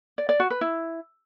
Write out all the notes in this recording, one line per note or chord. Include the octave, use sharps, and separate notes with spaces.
D5
D5
F#4
B4
E4